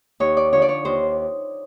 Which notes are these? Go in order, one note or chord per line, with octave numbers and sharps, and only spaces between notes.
D#2 C#5
D5
D3 F3 C#5
D5
C#5
D#2 C5